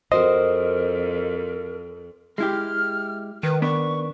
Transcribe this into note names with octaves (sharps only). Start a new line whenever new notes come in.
F2 F#4 A#4 C5 D#5
G#3 E4 G4 F6
D#3 B4
B3 D4 C#6